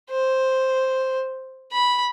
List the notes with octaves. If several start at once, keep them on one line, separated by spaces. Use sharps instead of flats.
C5
B5